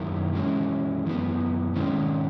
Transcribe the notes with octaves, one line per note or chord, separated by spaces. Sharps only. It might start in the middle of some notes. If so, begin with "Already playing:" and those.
Already playing: F#2 D#3 A#3 E4
E3 G#3 C#4
F#2 E3 B3
G#2 D#3 G#3 C#4